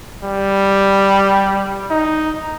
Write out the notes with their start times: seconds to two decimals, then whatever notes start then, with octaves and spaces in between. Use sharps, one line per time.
0.24 G3
1.91 D#4